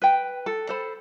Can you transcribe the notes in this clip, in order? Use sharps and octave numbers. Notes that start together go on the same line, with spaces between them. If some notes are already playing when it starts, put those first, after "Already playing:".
B4 G5
A4
A4 C5 B5